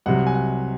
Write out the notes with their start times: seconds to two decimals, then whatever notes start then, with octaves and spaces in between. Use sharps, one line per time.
0.06 C2 C3 F#3 F#5
0.27 G#5
0.35 F#5